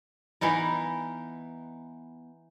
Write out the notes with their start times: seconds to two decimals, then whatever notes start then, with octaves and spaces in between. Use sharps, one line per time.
0.41 E3 B3 D#4 A#4